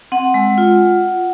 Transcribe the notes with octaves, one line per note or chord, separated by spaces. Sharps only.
C4 F#5
G#3
F4